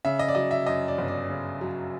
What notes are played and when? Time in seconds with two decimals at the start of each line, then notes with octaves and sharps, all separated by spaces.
0.05 C#3 E5
0.19 D#5
0.28 D5
0.35 F#3 D#5
0.51 E5
0.66 F#2 D#5
0.88 D5
0.98 G1
1.08 D5
1.29 C#3
1.61 F#3